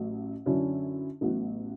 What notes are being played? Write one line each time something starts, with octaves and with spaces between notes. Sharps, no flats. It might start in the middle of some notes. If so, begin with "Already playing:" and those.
Already playing: A1 A2 F#3
F#2 D3 F#3 C#4 E4
A1 A2 F#3 B3 F#4